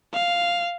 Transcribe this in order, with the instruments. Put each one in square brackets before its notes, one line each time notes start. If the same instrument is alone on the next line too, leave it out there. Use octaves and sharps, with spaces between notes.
[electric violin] F5